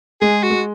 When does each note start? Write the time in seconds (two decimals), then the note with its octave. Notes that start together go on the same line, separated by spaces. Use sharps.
0.21 G#3 G#4
0.43 F#4
0.50 G#3